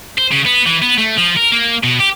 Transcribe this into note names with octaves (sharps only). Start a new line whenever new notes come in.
C5
C#3
B3
E3
B3
A3
F3
A#4
A#3
B2
G4